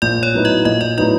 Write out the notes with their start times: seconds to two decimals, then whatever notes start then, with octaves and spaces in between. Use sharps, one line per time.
0.02 A#1 D5
0.23 C#5
0.34 A2 F#3 B3 D#4
0.45 D#5
0.65 A#1 D#5
0.81 D5
0.97 A2 F#3 B3 D#4 D5